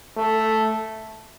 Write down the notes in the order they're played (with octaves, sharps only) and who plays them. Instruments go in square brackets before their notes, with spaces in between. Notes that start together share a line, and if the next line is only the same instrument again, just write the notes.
[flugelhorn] A3